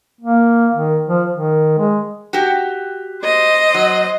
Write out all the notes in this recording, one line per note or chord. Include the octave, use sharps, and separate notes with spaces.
A#3
D#3
F3
D#3
G#3
F#4 G4
C5 D#5
F#3